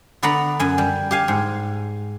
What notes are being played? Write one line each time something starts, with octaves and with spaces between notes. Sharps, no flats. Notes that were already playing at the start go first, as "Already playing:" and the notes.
D3 B3 B4 D5 F#5 A#5
F#2 G#5
G3
G4 F5 G#5
G#2